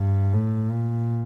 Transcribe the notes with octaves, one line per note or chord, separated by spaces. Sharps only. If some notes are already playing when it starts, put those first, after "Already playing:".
Already playing: G2
A2
A#2